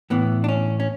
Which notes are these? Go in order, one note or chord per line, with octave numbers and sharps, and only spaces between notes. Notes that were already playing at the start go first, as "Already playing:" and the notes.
A2 E3 B3
D4
C#4
C#4